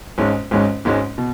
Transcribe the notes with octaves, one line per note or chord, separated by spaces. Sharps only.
G#1 G#2 G#3 C#4
G#1 G#2 G#3 C#4
G#1 G#2 G#3 C#4
B2